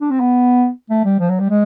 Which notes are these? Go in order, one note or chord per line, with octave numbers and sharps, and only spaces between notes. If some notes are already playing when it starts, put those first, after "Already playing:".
D4
C4
B3
A3
G3
F3
F#3
G3
G#3